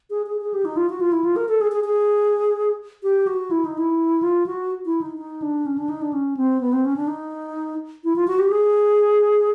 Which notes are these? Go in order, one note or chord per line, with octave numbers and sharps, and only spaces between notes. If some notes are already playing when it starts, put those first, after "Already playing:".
G#4
G#4
G#4
G4
D#4
F4
F#4
F4
E4
F4
A#4
A4
G#4
G#4
G#4
G4
F#4
E4
D#4
E4
F4
F#4
E4
D#4
D#4
D4
C#4
D4
D#4
D4
C#4
C4
B3
C4
C#4
D4
D#4
E4
F4
F#4
G4
G#4